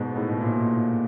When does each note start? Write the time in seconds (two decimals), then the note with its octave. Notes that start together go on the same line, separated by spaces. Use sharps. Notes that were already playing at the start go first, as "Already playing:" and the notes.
Already playing: G#2 B2
0.16 A2
0.29 B2
0.41 A#2